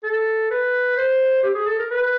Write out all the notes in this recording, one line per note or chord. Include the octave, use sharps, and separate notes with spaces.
A4
B4
C5
G4
G#4
A4
A#4
B4